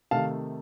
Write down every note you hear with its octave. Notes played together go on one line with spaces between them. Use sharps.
C3 D#3 A3 F5 A5